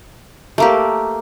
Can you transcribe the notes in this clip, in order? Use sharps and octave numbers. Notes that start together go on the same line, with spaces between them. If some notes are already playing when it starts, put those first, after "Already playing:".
A3 A#3 G4